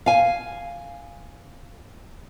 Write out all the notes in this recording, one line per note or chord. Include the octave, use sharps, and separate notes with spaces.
F5 G#5